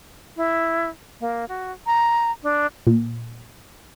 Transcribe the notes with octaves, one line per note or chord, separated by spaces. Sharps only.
E4
A#3
F#4
A#5
D4
A#2